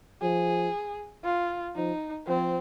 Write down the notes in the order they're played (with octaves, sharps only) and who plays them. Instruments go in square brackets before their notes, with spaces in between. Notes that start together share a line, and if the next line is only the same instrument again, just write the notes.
[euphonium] F3 [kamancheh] G#4
[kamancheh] F4
[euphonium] F3 [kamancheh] D#4
[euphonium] F3 [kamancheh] C4